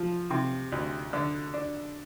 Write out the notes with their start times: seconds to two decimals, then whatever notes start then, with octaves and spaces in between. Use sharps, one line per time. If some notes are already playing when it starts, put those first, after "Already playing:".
Already playing: F3
0.30 C3
0.72 D2
1.13 D3
1.54 D4